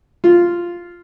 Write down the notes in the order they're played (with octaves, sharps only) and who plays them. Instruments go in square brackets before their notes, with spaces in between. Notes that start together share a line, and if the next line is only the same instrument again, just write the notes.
[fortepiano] F4